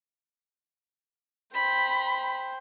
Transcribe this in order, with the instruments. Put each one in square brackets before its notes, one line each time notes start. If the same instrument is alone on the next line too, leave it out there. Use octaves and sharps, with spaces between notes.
[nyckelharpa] C5 G5 [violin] B5